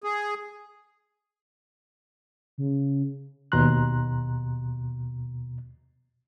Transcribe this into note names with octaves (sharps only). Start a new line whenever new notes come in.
G#4
C#3
D#2 B2 A#5 C6 F#6